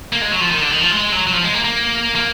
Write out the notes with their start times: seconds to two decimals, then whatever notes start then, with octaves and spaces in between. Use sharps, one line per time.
0.13 A#3
0.21 G#3
0.31 F#3
0.41 F3
0.51 D#3
0.61 D3
0.71 D#3
0.81 F3
0.91 G#3
1.12 F#3
1.27 F#3
1.33 F3
1.43 G#3
1.54 A#3
1.64 A#3
2.15 A#3